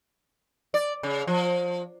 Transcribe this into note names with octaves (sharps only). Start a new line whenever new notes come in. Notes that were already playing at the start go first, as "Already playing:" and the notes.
D5
C#3
F3